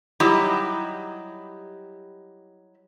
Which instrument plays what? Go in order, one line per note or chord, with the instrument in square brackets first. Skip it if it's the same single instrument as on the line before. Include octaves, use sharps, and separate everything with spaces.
[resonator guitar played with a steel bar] F#3 G3 D#4 E4 G4